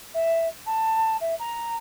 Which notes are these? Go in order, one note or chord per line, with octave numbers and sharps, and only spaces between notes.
E5
A5
E5
A#5